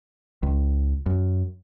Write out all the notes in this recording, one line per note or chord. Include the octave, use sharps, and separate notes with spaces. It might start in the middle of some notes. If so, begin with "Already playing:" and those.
C#2
F#2